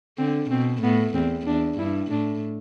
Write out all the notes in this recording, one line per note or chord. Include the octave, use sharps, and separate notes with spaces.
D3 C4
B2 C4
A2 B3
E2 C4
E2 D4
G2 E4
A2 D4